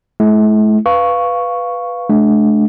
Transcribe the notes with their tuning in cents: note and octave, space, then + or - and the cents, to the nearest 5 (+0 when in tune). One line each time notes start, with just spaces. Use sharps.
A3 -45 E4 +0
B4 +0 F5 +0 C#6 +0
A3 -45 D4 +0